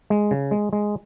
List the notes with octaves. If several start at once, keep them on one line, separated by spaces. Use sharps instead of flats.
G#3
C#3
G#3
G#3